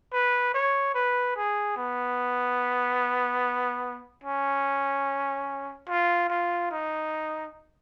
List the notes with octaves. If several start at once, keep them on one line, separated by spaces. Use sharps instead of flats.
B4
C#5
B4
G#4
B3
C#4
F4
F4
D#4